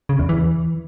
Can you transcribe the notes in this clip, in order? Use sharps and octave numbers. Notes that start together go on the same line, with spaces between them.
C#3
E2
E3